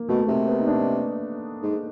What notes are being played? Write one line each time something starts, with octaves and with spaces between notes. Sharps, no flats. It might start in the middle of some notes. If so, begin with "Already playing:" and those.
Already playing: A#3
B2 A3
C3 A#3
B3
D#4
D4
G#2